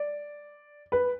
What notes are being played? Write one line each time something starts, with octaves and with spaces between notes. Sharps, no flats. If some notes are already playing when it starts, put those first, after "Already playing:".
Already playing: D5
B4